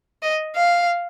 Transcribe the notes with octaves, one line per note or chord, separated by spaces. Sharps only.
D#5
F5